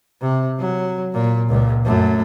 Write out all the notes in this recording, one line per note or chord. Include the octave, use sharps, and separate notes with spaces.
C3
F#3
A#2
C#2 A#2
F#2 A3